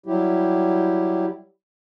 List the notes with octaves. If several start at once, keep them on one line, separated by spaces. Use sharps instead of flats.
F#3 G3 E4 G4